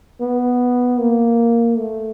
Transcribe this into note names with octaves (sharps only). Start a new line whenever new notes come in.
B3
A#3
A3